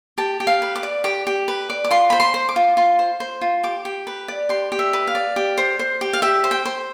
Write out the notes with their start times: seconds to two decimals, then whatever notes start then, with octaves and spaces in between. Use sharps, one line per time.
0.18 G4 A5
0.40 G4
0.47 F5
0.62 B4
0.76 D6
0.83 D5
1.04 G4 D6
1.27 G4
1.48 B4
1.70 D5
1.84 D6
1.91 F4 C6
2.10 C5 B5
2.20 C6
2.34 C5
2.49 D6
2.56 F4
2.77 F4 C6
2.99 C5
3.20 C5
3.41 F4
3.63 G4 D6
3.85 G4
4.07 B4
4.28 D5
4.49 G4 C6
4.72 G4
4.79 E5
4.93 B4
5.07 F5
5.15 D5
5.36 G4
5.58 C5
5.79 C5
6.01 G4
6.13 F5
6.22 G4 E5
6.44 C5
6.51 G5
6.65 C5